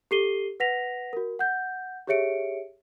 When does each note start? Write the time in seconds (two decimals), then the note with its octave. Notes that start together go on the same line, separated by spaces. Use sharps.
0.11 G4 A4 C7 D#7 G7
0.60 B4 F#5 A#6 B6 F7
1.13 F#4 A#4
1.39 F#5 G6
2.07 G4 G#4 C#5 E5 C#7 D7